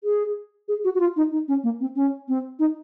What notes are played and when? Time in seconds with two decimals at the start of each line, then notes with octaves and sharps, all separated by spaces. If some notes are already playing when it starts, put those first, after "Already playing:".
0.04 G#4
0.68 G#4
0.84 F#4
0.95 F#4
1.00 F4
1.16 D#4
1.32 D#4
1.48 C#4
1.63 A#3
1.80 C4
1.96 C#4
2.28 C4
2.59 D#4